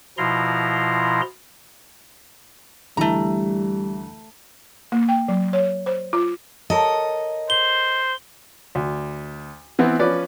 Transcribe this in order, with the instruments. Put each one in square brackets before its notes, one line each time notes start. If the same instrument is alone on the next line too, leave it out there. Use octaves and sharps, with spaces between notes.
[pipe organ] B2 F3 E4 F4 A#5 C6
[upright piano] D2 E3 [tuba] G3 [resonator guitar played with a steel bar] A3 A#5
[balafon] A#3
G5
F#3
C#5
C5
F4
[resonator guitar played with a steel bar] A4 A#4 C#5 [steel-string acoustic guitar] D#5
[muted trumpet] C5 [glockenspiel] G7
[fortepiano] D2
E3 B3 C4 E4
F3 C#4 B4 D5